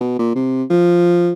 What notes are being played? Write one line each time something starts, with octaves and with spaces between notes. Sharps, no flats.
B2
A#2
C3
F3